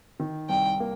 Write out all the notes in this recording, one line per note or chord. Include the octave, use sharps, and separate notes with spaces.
D#3
C2 G5
A#3